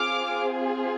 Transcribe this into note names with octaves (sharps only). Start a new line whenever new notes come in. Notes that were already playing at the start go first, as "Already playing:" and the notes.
Already playing: C4 F4 G#4 D6 F6